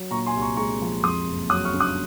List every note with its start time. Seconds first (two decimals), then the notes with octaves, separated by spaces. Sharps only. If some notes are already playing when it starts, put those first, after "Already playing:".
Already playing: F#3
0.11 A#2 A#5 C#6
0.26 G#5 C6
0.35 C2
0.41 A#5 C#6
0.57 G#3 A#5 C#6
0.81 F3
1.03 F2 C6 D#6
1.27 F#1
1.50 F#3 D#6 F#6
1.65 C#6 F6
1.73 C#3
1.80 D#6 F#6